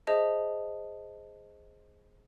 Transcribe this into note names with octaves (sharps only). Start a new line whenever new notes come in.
G#4 C5 D#5 E5 A5